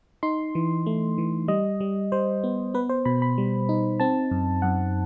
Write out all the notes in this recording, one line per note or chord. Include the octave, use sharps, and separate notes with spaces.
D#4 C6
E3
A3
E3
G3 D#5
G3
G3 C5
B3
B3 B4
C5
B2 B5
B5
G3
D#4
C4 A5
F#2
F#2 F#5